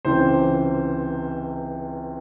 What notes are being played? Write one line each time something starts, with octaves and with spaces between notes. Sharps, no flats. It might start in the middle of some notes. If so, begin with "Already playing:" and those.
C#2 C3 E3 C5